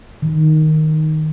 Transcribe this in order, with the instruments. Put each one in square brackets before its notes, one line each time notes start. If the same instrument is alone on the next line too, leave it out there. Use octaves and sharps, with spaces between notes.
[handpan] D#3